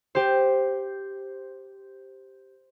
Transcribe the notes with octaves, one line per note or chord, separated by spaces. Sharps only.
G4 C5